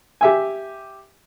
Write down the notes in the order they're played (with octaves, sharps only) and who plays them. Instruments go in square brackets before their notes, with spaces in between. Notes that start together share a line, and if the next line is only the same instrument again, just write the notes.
[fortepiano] G4 E5 G#5